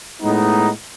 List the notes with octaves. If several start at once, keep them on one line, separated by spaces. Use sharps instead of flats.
A2 G#3 B3 D#4